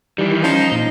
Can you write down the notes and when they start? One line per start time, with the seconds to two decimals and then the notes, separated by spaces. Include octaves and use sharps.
0.18 D#3 E3 G3
0.44 F3 C#4 D#4
0.72 A#2